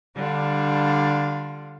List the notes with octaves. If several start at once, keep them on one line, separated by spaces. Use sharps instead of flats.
D3 G3 D4 F4